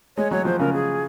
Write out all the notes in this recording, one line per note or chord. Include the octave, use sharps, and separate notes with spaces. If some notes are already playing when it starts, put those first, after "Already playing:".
G#3 C#5
F#3 C#5
F3 C5
C#3 A#4
G#4